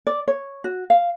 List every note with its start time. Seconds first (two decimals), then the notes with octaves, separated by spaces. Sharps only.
0.07 D5
0.28 C#5
0.64 F#4
0.90 F5